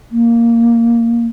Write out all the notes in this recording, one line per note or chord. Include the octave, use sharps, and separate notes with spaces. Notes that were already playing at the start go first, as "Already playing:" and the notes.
A#3